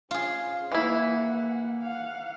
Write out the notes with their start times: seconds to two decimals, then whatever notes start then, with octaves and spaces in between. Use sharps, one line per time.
0.11 C#4 F4 G#4
0.72 E3 A#3 E4 F#5
1.82 F5 F#5